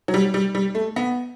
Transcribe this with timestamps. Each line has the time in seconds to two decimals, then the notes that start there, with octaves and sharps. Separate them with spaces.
0.08 F#3
0.14 G3
0.34 G3
0.55 G3
0.75 A3
0.96 B3